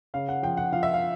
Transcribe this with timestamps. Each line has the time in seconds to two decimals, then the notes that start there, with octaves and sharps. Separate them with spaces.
0.14 C#3 F5
0.29 F#5
0.43 F3 G5
0.57 F#5
0.72 F3 F5
0.83 E5
0.94 F5